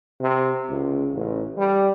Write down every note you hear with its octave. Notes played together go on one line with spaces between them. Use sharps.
C3
C#2
A1
G3